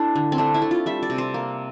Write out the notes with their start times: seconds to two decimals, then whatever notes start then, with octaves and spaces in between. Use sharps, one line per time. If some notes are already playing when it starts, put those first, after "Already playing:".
Already playing: A3 D4 E4
0.15 D3
0.32 C4
0.38 A3 D4
0.54 E4
0.62 A3
0.71 F4
0.86 G3 E5
1.03 D5
1.10 C3
1.18 C5
1.34 A#3